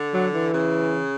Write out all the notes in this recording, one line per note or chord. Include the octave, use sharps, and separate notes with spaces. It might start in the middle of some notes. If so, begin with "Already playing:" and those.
Already playing: D3
F#3
E3
C#3